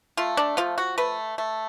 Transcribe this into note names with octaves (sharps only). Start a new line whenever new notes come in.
A3 F4
D4
F3 F4
F#4
A3 B4
A3